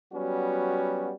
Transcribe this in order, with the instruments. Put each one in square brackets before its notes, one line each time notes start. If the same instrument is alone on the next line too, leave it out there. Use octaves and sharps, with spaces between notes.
[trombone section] F#3 G3 B3 C#4 F#4